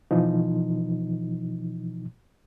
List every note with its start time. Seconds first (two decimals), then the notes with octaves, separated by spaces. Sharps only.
0.11 B2 E3 F3 D#4